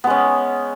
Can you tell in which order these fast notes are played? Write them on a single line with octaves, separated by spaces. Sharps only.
B3 G#3 C#4